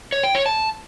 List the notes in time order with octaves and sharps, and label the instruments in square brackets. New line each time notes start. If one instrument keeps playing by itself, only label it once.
[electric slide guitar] C#5
G5
C#5
A5